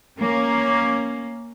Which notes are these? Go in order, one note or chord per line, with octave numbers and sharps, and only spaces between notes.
A#3 C#4